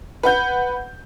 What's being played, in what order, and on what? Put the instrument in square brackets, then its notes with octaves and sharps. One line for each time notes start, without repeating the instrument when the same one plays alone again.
[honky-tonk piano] B4 F#5 G6